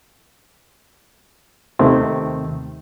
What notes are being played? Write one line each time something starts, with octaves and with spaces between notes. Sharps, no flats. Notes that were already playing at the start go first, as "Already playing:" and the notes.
D#2 C3 D#3 A3 C4